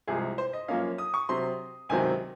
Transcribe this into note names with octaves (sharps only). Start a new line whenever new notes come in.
C2 C3 F3 G#3 G#4
C5
D#5
F#2 F3 A#3 C#4 F5
D#6
C#6
C3 F#3 C4 C6
C#2 C3 D#3 F#3 C4 G#5